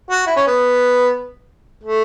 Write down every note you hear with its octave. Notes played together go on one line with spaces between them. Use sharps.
F#4
E4
C#4
B3
A3